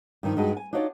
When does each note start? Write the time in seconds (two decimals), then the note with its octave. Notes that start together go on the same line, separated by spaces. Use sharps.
0.23 G2 D#3 F3
0.37 G2 G#3 D#4 F#4
0.57 G#5
0.73 D4 D#4 F4 F#4 C#5 D5